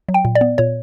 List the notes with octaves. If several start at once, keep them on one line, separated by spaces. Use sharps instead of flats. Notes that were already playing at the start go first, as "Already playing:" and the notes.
F#3
G5
A#2
D5
B3
A#2 C#5